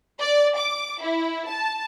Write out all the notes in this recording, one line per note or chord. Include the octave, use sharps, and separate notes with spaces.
D5
D6
E4
A5